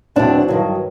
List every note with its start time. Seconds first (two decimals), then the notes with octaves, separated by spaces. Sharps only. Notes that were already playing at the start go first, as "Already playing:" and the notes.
0.16 E2 B2 F#3 C4 D4
0.48 G2 D#3 F#3